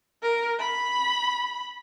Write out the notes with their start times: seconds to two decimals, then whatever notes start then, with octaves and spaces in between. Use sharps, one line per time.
0.22 A#4
0.60 B5